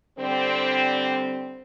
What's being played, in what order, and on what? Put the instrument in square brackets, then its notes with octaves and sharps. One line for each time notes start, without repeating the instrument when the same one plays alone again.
[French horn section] D3 G3 C4